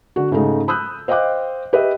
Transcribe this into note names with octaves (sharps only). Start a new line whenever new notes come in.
D3 F#4
G#2 C#3 G#3 A3 D#4
B5 D#6 E6 F#6 G6
C5 D#5 F5 G5 D6 F#6
G4 B4 D#5 E5